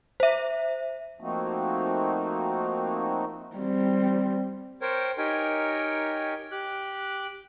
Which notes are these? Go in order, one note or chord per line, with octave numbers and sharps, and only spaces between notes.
C5 E5
F3 A3 A#3 C4 D#4 F#4
G3 C4
A#4 C5 C#5 G5
D#4 G4 A#4 C#5 G5 G#5
G4 D6 F#6